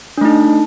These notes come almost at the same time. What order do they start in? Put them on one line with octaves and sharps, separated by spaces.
D4 A3 D#4